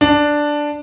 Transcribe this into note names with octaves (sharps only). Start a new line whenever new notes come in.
D4